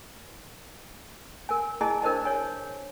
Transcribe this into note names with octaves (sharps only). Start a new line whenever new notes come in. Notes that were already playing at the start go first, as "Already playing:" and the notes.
A#4 G#5
E4 G#4 D#5 G#5 A5
D4 A#4 C5 D#5 A5
C#5 G#5